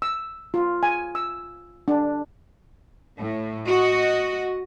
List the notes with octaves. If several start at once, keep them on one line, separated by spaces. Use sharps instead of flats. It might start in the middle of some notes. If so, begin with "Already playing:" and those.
E6
F4
G#5
E6
D4
A2
F#4 D#5